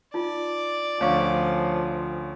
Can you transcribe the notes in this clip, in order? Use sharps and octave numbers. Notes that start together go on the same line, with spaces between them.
D#4 F4 D5
D2 F3 C#4 C#5 F5 C#6